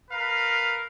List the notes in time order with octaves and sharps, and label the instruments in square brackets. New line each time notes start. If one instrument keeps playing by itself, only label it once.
[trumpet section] A#4 B4 F5